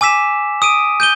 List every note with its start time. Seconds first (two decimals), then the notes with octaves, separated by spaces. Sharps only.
0.01 G#5 D6 E6 B6 E7
0.62 D#6 D7 D#7
1.00 G6 D#7 G7